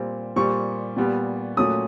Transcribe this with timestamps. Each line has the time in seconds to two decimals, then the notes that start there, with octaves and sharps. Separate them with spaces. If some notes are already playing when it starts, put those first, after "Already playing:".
Already playing: A#2 G3 C4
0.36 A#2 G3 C4 C#6
0.97 A#2 G3 B3
1.57 A#2 F#3 A3 C#4 D#6